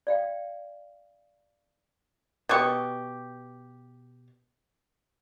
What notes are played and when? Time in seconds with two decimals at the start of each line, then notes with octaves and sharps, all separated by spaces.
0.07 D5 F5 G5
2.49 B2 G4 C#6